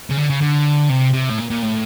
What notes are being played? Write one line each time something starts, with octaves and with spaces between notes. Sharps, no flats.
C#3
D3
C#3
D3
C3
C3
A2
A#2
A#2
A2